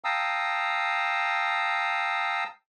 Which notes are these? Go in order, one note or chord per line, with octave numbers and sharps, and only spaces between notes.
F5 G5 A5 A#5 D#6 E6